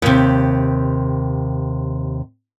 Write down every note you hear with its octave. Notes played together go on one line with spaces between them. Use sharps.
D#2 C3